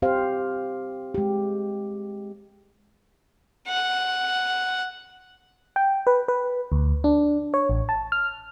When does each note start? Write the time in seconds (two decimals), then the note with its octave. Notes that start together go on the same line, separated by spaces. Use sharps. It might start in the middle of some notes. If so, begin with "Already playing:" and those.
0.02 C4 G4 C5 F5
1.14 G#3 G4
3.69 F#5
5.76 G5
6.07 B4
6.28 B4
6.72 D2
7.04 D4
7.54 C#5
7.69 A1
7.89 A5
8.12 F6